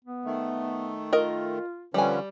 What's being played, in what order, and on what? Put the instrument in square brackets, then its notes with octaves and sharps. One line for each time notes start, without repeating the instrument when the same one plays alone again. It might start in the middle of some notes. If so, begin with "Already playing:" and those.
[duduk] B3
[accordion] D#3 A3
[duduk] F4 [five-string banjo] A#4 D#5
[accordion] D3 F3 C#4 [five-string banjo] G3 G#5 [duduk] B4